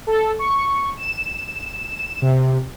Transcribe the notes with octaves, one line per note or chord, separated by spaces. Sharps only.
A4
C#6
E7
C3